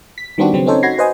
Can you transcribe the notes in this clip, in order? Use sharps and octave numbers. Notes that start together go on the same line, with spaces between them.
B6
D#3 G3 B3 C4 D4 F#4
C#3 F#3 B3 C4
C4 C#4 D#4 A4 C5 C#5
D#4 F#4 B5 G#6 A#6 C7
F#4 B4 C5 D#5 G#5